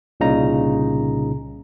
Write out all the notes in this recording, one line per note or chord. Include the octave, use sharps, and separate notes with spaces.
C2 A#2 C#3 D#4 A#5